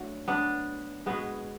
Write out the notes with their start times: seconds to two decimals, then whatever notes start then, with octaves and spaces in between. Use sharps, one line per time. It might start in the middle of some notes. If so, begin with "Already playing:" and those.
Already playing: F#3 A3 D4
0.28 B3 D4
1.06 B2 G#3 B3